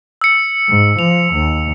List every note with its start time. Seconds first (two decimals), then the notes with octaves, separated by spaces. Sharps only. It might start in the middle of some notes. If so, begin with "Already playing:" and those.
0.21 E6 C#7
0.69 G#2
0.99 F3 F7
1.33 D#2